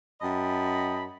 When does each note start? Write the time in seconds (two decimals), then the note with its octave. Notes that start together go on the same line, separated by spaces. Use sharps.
0.21 F#2 D#5 G5 A5 B5